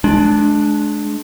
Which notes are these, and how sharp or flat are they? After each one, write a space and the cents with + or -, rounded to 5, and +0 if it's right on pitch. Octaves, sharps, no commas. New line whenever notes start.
G#3 +35 D4 +0